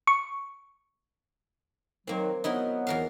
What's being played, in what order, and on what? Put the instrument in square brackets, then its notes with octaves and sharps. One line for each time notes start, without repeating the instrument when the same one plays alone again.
[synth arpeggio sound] C#6
[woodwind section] D#3 F#3 [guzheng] A#3 C4
[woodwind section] F#3 B3 [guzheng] D#4 E4 A#4
[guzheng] E2 A#4 F5